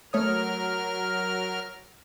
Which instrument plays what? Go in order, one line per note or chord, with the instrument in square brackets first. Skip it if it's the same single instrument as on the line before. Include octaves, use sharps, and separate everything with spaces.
[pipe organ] F#3 A#4 F6 [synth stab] A3 C#5 D#6